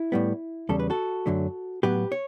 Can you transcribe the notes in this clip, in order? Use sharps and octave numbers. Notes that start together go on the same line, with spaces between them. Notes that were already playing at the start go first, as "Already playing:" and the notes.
Already playing: E4
A2 G3 B3
E2 C#3 G3 A4
B4
F#4 A4
F#2 D3 F#3 A3
A2 F#3 B3 G4 B4
C#5